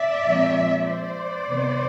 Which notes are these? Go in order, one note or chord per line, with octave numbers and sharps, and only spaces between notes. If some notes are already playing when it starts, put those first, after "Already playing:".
Already playing: D5 E5
A#2 F3 G#3 C4
C5 D5
C3 D#3 G3 B3